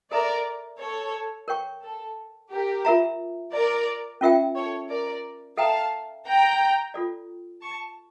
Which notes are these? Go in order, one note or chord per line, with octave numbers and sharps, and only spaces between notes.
A4 A#4 D5 E5 A#5
A4 C#5
A#4 C#5 G5 C#6
A4
G4 A#4
F4 A#4 E5 A#5
A#4 D5
C#4 F4 A#4 E5 G5
A4 C#5
A#4 D5
A4 E5 F5 G5 A5 A#5
G5 A#5
F4 A4 D5
A5 C#6